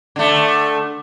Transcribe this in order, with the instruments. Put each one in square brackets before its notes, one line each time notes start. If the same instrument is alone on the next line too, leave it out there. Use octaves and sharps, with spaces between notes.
[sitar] D3 A3